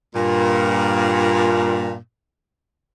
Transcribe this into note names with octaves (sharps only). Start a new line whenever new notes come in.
G2 A#2